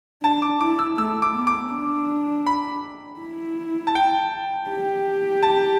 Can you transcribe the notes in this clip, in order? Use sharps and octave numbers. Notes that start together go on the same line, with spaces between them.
D4 A5
D6
E4 D6
E6
A3 E6
D6
B3
D6
D4
B5
E4
A5
G5
G4
A5